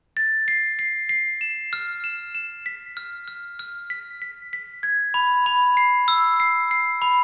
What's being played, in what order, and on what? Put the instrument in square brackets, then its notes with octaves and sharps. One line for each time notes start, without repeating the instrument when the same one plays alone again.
[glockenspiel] A6
C7
C7
C7
E7
F6
E7
E7
B6
F6
F6
F6
B6
B6
B6
G#6
B5
B5
C7
E6
C7
C7
B5